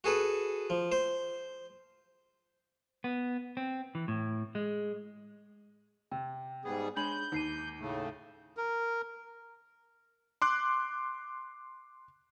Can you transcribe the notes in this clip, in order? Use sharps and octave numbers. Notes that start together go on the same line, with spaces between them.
F#4 G#4 A4 B4
F3
C5
B3
C4
E3
A2
G#3
C3 G5
G#2 G3 B3 G#4
G#3 D4 C#5 G#5 B5 G6 F#7
D#2 D#4 C7 D#7
A2 C#3 A3
A#4
C6 D6 F#6